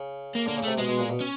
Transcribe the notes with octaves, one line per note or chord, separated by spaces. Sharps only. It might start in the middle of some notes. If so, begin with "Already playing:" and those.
Already playing: C#3
A#3
D3 A#3
C#3
C3 A3
B2 G#3
B2
A#2
B2
C#4